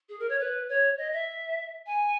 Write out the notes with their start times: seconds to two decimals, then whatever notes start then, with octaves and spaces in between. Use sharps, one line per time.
0.09 G#4
0.20 A#4
0.29 C#5
0.40 B4
0.69 C#5
0.98 D#5
1.13 E5
1.86 G#5